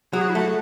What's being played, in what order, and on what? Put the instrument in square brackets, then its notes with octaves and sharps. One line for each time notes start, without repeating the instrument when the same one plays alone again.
[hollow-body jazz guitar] F#3 [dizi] G#4
[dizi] F#4
E4
[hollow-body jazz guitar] A3 [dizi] F#4